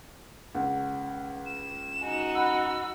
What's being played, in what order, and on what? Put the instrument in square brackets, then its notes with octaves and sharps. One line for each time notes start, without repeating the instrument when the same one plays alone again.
[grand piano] C#2 [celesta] F#5
[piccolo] E7
[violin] D#4 F#4 [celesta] G#5
[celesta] F#5 B5 F#6 [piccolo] E6